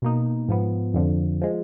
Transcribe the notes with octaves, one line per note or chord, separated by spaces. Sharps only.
B2 A#3 D#4
G#2 F3 B3
F2 D3 F3
F3 G#3